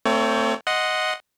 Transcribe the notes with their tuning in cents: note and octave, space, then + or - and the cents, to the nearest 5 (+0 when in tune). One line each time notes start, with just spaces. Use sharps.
A3 +30 C4 +0 C#5 +35
D#5 +0 F#5 -5 C6 +0